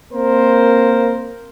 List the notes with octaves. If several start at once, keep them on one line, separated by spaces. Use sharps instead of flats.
A#3 C4 A#4 C5